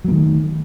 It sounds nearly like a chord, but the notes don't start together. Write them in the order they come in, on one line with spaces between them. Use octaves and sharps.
F#3 A#3 D#3 A3